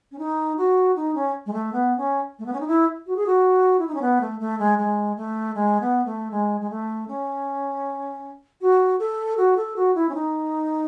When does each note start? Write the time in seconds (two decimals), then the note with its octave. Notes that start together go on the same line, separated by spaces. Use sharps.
0.11 C#4
0.18 D#4
0.57 F#4
0.96 D#4
1.14 C#4
1.46 G#3
1.52 A3
1.72 B3
1.97 C#4
2.39 A3
2.45 B3
2.53 C#4
2.60 D#4
2.67 E4
3.06 F#4
3.16 G#4
3.26 F#4
3.79 E4
3.87 D#4
3.94 C#4
4.01 B3
4.20 A3
4.39 A3
4.59 G#3
4.78 G#3
5.16 A3
5.54 G#3
5.80 B3
6.05 A3
6.31 G#3
6.60 G#3
6.70 A3
7.08 C#4
8.61 F#4
8.99 A4
9.37 F#4
9.56 A4
9.76 F#4
9.95 E4
10.09 C#4
10.14 D#4